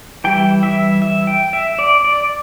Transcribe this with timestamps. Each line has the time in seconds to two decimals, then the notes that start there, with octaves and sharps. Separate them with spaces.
0.24 E3 G3 E4 G5
0.63 E5
1.02 E5
1.27 G5
1.53 E5
1.79 D5
2.05 D5